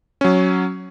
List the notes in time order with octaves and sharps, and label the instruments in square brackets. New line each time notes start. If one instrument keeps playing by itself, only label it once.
[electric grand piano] F#3 C#4